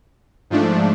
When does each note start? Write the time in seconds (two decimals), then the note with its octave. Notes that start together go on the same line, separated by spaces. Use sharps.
0.50 G#2 F3 A3 D4